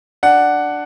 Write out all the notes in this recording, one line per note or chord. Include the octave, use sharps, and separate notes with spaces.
D4 F#5